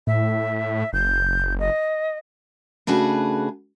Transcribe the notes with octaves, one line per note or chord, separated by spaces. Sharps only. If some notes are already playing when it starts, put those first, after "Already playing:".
A2 E5
F#1 G6
D#5
C#3 A3 D4 F#4 G#4 B4